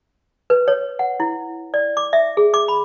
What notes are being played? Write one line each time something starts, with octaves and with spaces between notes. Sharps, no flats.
B4
C#5
F#5
E4
D5
D6
E5
G#4
D6
B5